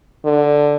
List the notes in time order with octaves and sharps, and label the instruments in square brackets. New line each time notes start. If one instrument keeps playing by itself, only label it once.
[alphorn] D3